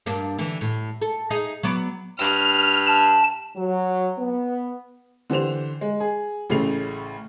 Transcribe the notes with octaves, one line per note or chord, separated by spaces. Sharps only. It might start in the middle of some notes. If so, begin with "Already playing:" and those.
G2 A#3 D4
D3 E3
A2
A4
D#4 G#4 D#5
F#3 B3 D5
G2 F6
A5
F#3
B3
D3 E3 G4 C5 E7 F7
G#3
G#4
A1 A2 C#3 A3 C7 F7